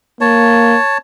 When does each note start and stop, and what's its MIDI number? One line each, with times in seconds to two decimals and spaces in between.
0.21 0.77 58
0.21 0.98 73
0.21 0.98 81